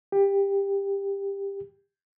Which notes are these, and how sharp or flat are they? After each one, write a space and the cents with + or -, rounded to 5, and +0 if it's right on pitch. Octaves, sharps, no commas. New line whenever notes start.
G4 +15